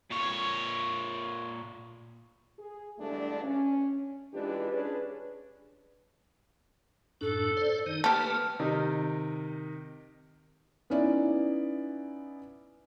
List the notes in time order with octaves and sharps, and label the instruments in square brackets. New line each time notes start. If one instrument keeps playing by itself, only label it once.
[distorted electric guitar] A#2 C#5
[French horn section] G#4
E2 G2 D3 G#3 A3 D4
C#4
E3 G#3 D4 F4 G4 B4
C#4 D4 G#4 B4
[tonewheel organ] F#2 A2 D4 [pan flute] A4
[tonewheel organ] C5 D5
D#3 D#4
[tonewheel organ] A3 A#3 B4 [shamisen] G4 A4 [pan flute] F6
[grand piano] C3 D#3 D#4
[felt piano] B3 C#4 D#4 E4 D5